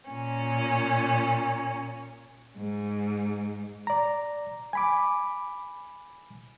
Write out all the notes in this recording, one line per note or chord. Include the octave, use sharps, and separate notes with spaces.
A#2 C#4
G#2
D5 A#5
G#5 B5 D6